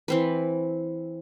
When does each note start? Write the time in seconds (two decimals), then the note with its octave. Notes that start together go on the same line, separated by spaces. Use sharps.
0.08 E3 C4 B4